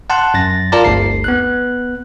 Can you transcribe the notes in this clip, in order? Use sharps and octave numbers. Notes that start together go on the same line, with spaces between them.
F#5 A5 C6 F#6
F#2 A6 A#6
F4 A#4 D5 A5 A#5
G1 D2 C7
B3 F#6